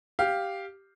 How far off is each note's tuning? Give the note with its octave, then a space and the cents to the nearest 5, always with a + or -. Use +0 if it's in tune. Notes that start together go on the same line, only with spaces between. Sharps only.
G4 +0 F5 +0